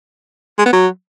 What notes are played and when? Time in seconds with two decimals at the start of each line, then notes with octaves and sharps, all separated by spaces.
0.59 G#3
0.66 B3
0.73 F#3